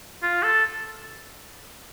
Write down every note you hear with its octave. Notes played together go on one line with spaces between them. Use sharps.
F4
A4